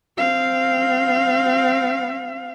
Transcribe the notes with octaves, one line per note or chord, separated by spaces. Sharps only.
C4 F5